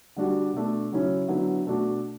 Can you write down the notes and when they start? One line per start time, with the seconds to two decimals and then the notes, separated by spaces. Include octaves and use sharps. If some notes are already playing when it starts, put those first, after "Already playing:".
0.16 D3 G3 D4 F#4
0.53 B2 A3 D4
0.92 C#3 F#3 C#4 E4
1.28 D3 F#3 B3 E4
1.66 B2 A3 D4 F#4